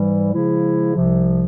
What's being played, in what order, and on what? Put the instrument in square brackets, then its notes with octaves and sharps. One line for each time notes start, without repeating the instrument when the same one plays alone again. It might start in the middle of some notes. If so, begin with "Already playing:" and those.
Already playing: [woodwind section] G#2 E3 G3
C#3 F3 G#3 E4
C2 C3 F3